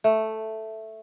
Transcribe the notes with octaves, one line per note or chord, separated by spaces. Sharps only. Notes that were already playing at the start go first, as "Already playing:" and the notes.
A3